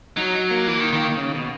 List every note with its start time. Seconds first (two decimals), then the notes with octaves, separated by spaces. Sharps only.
0.17 F#3 D#4
0.51 A#3
0.67 E3
0.80 D#3
0.93 D#3
1.17 C#3
1.35 B2